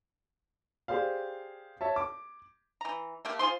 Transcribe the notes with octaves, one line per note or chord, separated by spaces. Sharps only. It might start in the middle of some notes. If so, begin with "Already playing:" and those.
G4 G#4 C5 D5 F5
C#5 E5 A5
D6
E3 A#5
A3 A#3 G4
F4 G#4 C5 C6